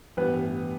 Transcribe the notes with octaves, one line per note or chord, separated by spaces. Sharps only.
A1 G2 E3 B3 B4